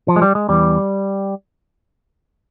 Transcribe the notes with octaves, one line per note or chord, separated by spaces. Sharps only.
F3
G#3
G3
G#3
E2 E3 G3